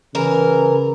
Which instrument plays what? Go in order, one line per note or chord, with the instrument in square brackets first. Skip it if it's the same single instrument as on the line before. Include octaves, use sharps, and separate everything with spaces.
[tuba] C#3 [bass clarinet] E3 [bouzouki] A#4